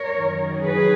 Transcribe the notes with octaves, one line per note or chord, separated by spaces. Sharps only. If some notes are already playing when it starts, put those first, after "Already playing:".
Already playing: A#4 C#5
F#2 D#3
G#4 B4